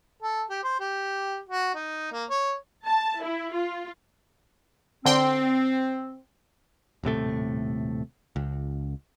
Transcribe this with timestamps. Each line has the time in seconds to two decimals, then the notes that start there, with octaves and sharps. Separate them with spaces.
0.23 A4
0.50 G4
0.64 C5
0.80 G4
1.49 F#4
1.75 D#4
2.12 A#3
2.30 C#5
2.85 A5
3.21 E4
3.52 F4
5.05 D3 C4 G5 C6
7.04 D#1 A2 C3 A3
8.36 C#2